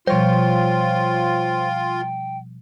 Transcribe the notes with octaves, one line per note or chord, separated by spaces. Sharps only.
B2 F3 G3 F4 C5 C#5 G5